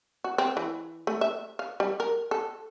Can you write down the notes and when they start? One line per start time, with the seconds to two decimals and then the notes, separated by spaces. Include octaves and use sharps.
0.24 F#4
0.38 C4
0.57 E3
1.07 A3
1.21 E5
1.59 F5
1.80 G3
2.00 A#4
2.31 A4